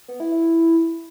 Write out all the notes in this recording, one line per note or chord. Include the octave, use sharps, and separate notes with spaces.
B3
E4
E4